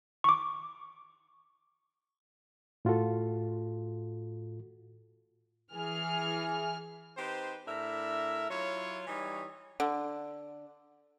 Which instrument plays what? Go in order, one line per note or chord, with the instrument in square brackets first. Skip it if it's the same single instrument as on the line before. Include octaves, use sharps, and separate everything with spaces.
[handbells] C#6 D6
[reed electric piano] A2 F4 F#4 A4
[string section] E3 G#4 F6
[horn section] C4 D#4 G4 B4 C5
A2 D4 A#4 E5
F#3 E4 F4 C#5
E3 G3 D#4 C#5
[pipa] D3